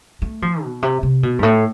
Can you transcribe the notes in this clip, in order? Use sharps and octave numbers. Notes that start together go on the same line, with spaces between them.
A3
F3
B2
C3
C3
B2
G2
A2